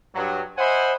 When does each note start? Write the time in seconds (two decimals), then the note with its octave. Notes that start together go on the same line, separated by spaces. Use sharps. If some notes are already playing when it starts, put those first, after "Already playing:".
0.14 G2 F#3
0.58 C5 D#5 E5 F#5 G#5 B5